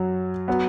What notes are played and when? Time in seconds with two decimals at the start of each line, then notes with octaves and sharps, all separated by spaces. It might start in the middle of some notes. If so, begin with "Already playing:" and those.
Already playing: F#2 F#3
0.48 F#3 B3